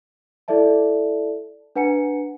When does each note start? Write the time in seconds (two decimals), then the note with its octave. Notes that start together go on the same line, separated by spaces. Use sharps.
0.48 E4 A4 D5 E5 A5
1.76 D4 B4 F#5 G#5 A#5 C#7